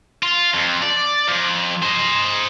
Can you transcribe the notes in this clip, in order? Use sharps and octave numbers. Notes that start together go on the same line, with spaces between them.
F4
F2
D5
F2
C5 D#5